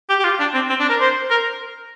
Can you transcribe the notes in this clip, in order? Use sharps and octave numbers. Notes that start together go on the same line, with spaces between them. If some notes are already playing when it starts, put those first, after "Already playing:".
G4
G4
F4
D4
C4
C4
D4
A#4
C5
A#4